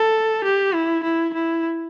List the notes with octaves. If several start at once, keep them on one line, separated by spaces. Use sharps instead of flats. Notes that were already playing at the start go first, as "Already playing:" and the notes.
Already playing: A4
G4
E4
E4
E4